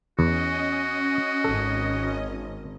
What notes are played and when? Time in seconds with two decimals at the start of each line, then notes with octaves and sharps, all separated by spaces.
0.19 E2 C#4 F#4 D#5
1.44 G#1 A4